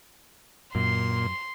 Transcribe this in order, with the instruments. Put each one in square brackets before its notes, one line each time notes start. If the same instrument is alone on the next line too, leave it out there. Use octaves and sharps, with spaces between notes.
[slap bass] F#2 [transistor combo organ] A#2 [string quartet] C6